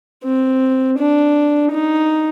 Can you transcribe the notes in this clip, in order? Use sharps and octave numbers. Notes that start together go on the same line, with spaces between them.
C4
D4
D#4